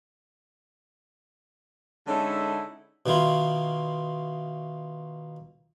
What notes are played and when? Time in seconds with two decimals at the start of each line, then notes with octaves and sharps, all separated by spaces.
2.07 D3 G#3 C#4 D#4 E4 A4
3.06 B2 D#3 E4 F4